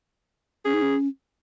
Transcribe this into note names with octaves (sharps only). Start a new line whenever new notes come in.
C#4 G#4
D#4
C#4